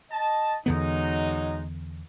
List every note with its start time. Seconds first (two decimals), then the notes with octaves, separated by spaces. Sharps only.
0.12 D#5 A5
0.66 E2 D3 F#3 G#3 B3 D#4